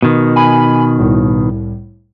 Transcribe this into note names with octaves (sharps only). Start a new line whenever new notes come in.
B2 D#3
G#5 B5
C2 A2